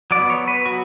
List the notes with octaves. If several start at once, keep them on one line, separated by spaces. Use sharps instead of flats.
F#3 B3 D5
C#5
B4
F#3 B3 F#4